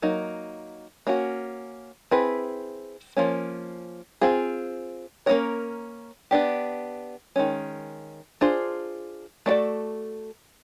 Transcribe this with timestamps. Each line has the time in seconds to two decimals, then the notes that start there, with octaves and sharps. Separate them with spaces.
0.02 F#3 A#3 D#4
1.07 A#3 C#4 F#4
2.11 C4 E4 G#4 B4
3.17 F3 A#3 C#4
4.21 C4 F4 G#4
5.26 A#3 C#4 F4 A#4 C#5
6.31 B3 D4 G4
7.36 D#3 G#3 C#4
8.41 D4 F4 G#4 C5
9.46 A3 D4 F#4 A4 D5